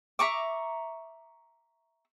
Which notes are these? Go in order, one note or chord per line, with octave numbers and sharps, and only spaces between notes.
E5 A#5 C#6 D6